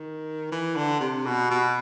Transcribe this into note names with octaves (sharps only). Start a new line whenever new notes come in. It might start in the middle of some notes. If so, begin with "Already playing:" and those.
Already playing: D#3
E3
D3
C3
B2
B2